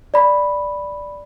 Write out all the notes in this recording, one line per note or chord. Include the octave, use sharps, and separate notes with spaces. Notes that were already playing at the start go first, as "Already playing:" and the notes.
D5 B5